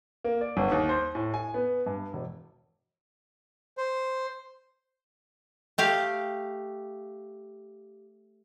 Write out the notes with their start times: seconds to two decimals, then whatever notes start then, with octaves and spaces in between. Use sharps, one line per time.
0.24 A#3
0.41 D5
0.57 G1
0.72 D#2
0.89 C5
1.15 A2
1.34 G#5
1.54 B3
1.86 G2
2.13 E1
3.77 C5
5.78 A3 G4 F5